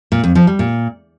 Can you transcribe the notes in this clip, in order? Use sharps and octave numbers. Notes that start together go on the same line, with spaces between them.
A#2
F2
F3
G3
A#2